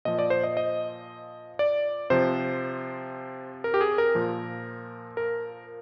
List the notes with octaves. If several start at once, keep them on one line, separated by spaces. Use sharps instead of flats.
A#2 F3 D#5
D5
C5
D#5
D#5
D5
C3 F3 C5
A#4
G4
G#4
A#4
A#2 F3
A#4